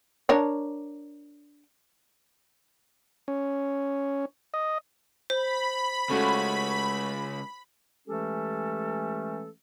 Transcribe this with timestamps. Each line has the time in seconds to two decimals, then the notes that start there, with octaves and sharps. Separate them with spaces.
0.29 D4 A#4 C#5
3.28 C#4
4.54 D#5
5.30 C5 B5
6.10 C#3 G#3 A3 C#4 F#4
8.08 E3 G#3 A3 C#4 G4 A4